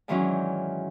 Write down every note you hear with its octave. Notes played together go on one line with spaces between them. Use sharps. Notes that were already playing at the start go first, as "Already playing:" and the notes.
G#2 D#3 E3 F#3 C#4 D4